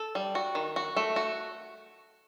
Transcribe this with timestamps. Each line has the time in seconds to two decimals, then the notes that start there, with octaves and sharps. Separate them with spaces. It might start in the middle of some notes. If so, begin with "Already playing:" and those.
Already playing: A4
0.15 G3
0.35 F#4
0.55 D#3
0.76 F#4
0.97 A3
1.16 F#4